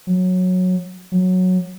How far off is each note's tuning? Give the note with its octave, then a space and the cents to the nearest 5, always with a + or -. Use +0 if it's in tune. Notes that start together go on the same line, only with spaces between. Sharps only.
F#3 -15
F#3 -10